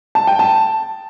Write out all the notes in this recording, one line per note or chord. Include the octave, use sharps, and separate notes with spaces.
A5
G5
A5